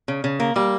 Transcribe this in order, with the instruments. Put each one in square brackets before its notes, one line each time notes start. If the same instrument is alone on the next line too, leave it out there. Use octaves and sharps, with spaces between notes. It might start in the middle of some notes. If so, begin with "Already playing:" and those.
[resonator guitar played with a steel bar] C#3
C#3
A#3
[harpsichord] G3 [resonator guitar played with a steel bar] A#3